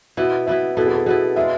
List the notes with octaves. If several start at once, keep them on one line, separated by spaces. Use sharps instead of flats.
B2 B3 E4 E5
B2 B3 E4 E5
B2 B3 E4 A4
G#4
A4
B2 B3 E4 G#4
G#3 D4 F4 E5